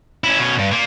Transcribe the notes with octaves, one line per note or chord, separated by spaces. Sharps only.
C#4 E4
B2 C#4
G2
A#2 A#3